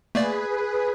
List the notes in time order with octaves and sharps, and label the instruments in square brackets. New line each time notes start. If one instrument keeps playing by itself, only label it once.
[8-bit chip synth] A3 A#3 D5 [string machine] G#4 B4